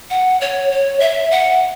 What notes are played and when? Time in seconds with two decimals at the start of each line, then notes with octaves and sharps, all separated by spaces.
0.10 F#5
0.41 C#5
0.71 C#5
1.00 E5
1.31 F#5